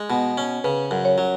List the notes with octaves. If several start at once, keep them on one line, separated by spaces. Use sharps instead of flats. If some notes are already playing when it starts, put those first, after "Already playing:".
Already playing: G#3
B2
C#4
C#3 B4
F#2
C#5
F#3